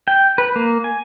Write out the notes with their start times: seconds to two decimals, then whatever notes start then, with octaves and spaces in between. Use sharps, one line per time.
0.08 G5
0.38 B4
0.56 A#3
0.84 G#5